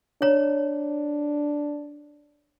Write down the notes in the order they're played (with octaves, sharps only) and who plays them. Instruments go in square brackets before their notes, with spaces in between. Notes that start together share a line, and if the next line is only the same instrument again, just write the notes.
[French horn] D4 [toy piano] C#5 A#5